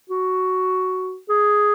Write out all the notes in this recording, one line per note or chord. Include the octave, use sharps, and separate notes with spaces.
F#4
G#4